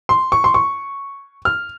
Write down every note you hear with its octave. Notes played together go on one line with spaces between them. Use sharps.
C6
C#6
C6
C#6
F6